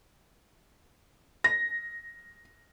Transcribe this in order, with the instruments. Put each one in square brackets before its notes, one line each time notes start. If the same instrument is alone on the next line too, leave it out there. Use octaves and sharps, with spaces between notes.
[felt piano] A#6